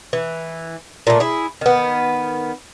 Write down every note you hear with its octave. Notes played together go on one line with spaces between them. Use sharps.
E3
A#2 A3
E4 G#4
D#3 B3